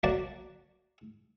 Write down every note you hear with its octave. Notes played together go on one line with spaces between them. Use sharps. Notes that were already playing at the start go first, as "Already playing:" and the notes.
F#3 A#3 F#4 D5 A5 A#5